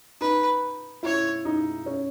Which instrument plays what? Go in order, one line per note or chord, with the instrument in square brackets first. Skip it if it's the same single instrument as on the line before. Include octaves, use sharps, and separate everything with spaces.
[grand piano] D#4 [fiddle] B4
[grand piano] E4 [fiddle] C#5
[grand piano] D#4
C#4